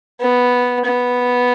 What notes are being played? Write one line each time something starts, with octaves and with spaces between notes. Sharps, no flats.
B3
B3